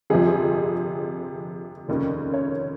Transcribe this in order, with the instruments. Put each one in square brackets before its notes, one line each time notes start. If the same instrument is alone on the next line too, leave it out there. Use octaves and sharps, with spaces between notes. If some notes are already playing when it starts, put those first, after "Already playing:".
[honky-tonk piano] G1 F2 C3 F3 G#4
F1 D#2 C#3
C#5